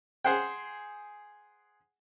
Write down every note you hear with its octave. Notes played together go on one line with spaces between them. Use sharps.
G#4 C5 F#5 G5